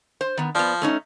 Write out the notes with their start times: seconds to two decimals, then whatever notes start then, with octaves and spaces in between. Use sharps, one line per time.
0.21 C5
0.37 D#3 B3
0.55 F3 B3 D5
0.82 A3 C#4 D#4